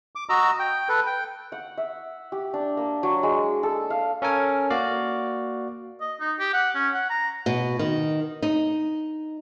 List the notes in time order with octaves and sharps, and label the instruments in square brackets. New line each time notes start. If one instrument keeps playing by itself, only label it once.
[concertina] D6
F#4 D#5 A#5 E6
G5
A4 B4
G5
[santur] F#5
E5
G4
D4
A#3
F#3
G#3
A4
F5
[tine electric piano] C#4 A4 A#4 G#5
A#3 F#4 D5 F5
[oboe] D#5
D#4
G4
F#5
C#4
F#5
A#5
[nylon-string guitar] B2
D#3
D#4